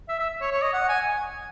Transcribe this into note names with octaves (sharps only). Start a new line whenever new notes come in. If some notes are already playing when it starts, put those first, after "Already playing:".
E5
E5
C#5
C#5
D#5
F#5
G#5